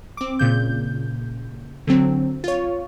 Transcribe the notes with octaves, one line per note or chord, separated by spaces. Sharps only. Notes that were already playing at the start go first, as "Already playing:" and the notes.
C4 D6
A#2 C#3 G6
D3 F#3 C4
F4 C#5